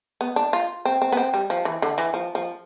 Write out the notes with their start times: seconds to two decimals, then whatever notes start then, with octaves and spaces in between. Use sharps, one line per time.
0.21 B3
0.36 D4
0.53 F4
0.85 C4
1.02 C4
1.12 B3
1.17 C4
1.34 G3
1.50 F3
1.65 E3
1.82 D3
1.98 E3
2.14 F3
2.35 F3